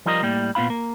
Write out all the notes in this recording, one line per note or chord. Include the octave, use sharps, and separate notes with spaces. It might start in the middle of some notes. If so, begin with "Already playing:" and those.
F3 G3 F4 A#4 D#5
A2 G3 A#3
A#2 B3 F4 F5 B5
A#3